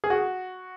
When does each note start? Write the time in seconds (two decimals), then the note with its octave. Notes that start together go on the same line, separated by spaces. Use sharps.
0.04 G#4
0.10 F#4